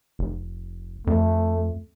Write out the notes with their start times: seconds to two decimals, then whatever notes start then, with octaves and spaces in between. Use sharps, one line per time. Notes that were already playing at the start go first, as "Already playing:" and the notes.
0.19 F1
1.07 F2 A3